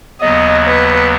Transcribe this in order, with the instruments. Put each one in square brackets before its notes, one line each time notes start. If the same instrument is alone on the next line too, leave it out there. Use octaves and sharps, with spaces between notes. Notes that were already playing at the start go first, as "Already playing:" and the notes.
[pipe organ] D#2 C#3 F#3 B3 [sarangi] D#5
[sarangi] B4